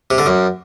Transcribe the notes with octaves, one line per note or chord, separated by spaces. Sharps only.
C3
D3
F#2